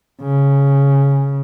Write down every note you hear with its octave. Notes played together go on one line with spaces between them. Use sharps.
C#3